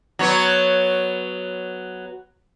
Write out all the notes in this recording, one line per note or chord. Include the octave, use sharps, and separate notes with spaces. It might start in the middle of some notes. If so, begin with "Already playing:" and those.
F#3 B3 C#5